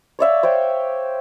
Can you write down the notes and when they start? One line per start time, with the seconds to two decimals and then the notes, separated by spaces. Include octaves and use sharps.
0.19 C#5 D5 E5 F5
0.43 C5 C#5 G5